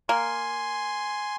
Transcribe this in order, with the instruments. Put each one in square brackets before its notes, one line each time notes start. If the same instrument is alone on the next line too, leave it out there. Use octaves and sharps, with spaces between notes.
[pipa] A#3 [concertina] G#5 C6